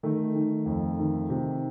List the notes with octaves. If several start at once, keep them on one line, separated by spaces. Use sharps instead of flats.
D#3 A3
D#3
F2
D#3
C3